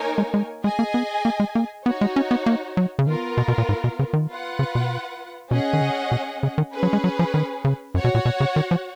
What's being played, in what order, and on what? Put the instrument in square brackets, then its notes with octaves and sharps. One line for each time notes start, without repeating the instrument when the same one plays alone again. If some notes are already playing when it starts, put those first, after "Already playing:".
Already playing: [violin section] A#3 D#4 A#4 C#5 G#5
[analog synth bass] G#3
G#3
[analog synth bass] G#3 [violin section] G#4 D#5 G#5
[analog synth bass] A#3
B3
A#3
G#3
A#3
[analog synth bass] B3 [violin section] D#4 F#4 C#5
[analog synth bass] G#3
C#4
B3
A#3
F#3
C#3
[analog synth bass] D#3 [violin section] B3 F4 A#4
[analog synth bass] B2
B2
A#2
G#2
B2
C#3
D#3
[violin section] F4 B4 F#5
[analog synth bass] C#3
B2
[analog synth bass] B2 [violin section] C#4 G#4 D#5 F#5
[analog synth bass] D#3
C#3
B2
C#3
D#3
[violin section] C#4 G#4 B4
[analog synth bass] F#3
G#3
F#3
F3
D#3
C#3
[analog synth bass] F#2 [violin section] F#4 C#5 F#5
[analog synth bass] B2
A#2
B2
C#3
D#3
F3